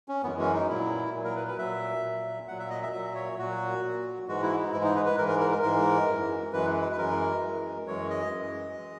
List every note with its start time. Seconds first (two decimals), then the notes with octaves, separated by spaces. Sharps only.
0.08 C#4
0.23 F#2 E3 G#3 B3
0.39 C#4
0.54 D#4
0.69 A#2 F#3 E4
1.13 A#2 F#3
1.24 A#4
1.36 B4
1.47 B4
1.58 A#2 F#3 E5
2.03 A#2 F#3
2.48 A#2 F#3 F#5
2.59 E5
2.70 D#5
2.83 E5
2.93 A#2 F#3 E5
3.15 C#5
3.38 A#2 F#3 F#4
3.82 A#2 F#3
4.28 G#2 E3 G#3 F#4
4.43 E4
4.58 D#4
4.72 G#2 E3 G#3 E4
4.84 D#4
4.96 B4
5.06 B4
5.18 G#2 E3 G#3 A#4
5.28 A#4
5.40 A#4
5.51 A#4
5.62 G#2 E3 G#3 A#4
6.07 F#2 E3 G#3
6.53 F#2 E3 G#3 B4
6.82 B4
6.92 B4
6.97 F#2 E3 G#3 A#4
7.42 F#2 E3 G#3
7.86 F#2 E3 G#3 C#5
8.10 D#5
8.32 F#2 E3 G#3
8.77 E3 G#3